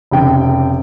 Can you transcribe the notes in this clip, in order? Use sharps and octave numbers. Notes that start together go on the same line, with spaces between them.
F1 C#3 G5